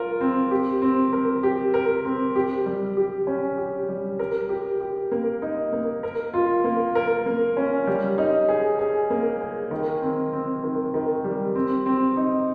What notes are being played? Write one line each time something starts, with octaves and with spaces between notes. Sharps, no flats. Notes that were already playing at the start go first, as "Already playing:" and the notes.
Already playing: F4 A#4
C4
G4
C4
A#4
G4
A#4
C4
G4
G3
G4
C#4
G4
G3
A#4
G4
G4
A#3
D#4
A#3
A#4
F4
A#3
A#4
A#3
C#4
G3
D#4
G#4
G#4
A#3
G#4
D#3
C4
C4
D#3
D#3
G3
C4
C4
D#4